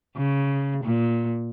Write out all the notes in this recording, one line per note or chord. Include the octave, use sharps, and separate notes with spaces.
C#3
A#2